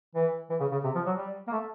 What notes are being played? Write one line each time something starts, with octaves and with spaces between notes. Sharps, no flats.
E3
E3
C#3
C#3
C3
F3
F#3
G3
A#3
A3